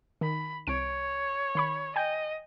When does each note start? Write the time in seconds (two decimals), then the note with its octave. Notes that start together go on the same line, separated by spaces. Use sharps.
0.21 D#3 B5
0.67 C2 C#5 D7
1.55 D#3 B5 C#6
1.96 D#5 G5 G#5 G6